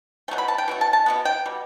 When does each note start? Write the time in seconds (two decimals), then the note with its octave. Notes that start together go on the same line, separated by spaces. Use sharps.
0.28 B2 F#3 A3 G5
0.38 B5
0.48 A5
0.58 G5
0.68 B2 F#3 A3
0.81 A5
0.93 A5
1.06 B2 G3 B3
1.25 G5
1.46 B2 G3